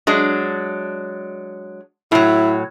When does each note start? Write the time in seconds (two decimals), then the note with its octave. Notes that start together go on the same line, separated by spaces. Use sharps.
0.07 F#3 G#3 D4
2.12 A2 F#3 E4